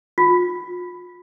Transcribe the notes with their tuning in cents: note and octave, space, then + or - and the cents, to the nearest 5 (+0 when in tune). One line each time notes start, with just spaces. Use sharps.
F4 +35